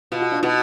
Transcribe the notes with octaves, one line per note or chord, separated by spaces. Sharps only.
B2 F4
F#4
D4 F4
B2 D#4 F#4